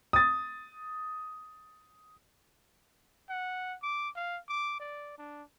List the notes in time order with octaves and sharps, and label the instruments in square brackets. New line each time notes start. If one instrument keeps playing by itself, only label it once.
[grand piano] D#6 A6
[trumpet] F#5
D6
F5
D6
D5
D4